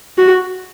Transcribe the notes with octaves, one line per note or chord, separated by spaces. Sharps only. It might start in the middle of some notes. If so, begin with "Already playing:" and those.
F#4